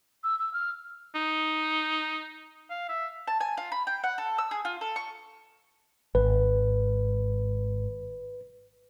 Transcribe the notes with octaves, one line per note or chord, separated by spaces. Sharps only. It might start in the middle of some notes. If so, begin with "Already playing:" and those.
E6
E6
F6
D#4
F5
E5
A5
G#5
F4
B5
G5
F#5
A4
E6
G#4
F4
A4
C#6
G#1 B4